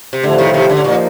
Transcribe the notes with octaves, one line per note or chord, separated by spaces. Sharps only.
C3
A2 D3 F3 A3
C3 D#3
C3 D#3
D3
A2
A#2 F3 A#3 D#4